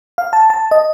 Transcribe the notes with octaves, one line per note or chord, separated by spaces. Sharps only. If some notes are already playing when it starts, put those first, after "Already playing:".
F5
A5
A5
D#5